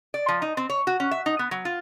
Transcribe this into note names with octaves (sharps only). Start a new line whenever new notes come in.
D5
F3
D#4
C4
C#5
F#4
C#4
E5
D#4
B3
F#3
F4